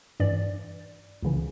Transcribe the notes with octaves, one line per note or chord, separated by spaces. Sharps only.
G2 E3 D5
C#2 C#3 E3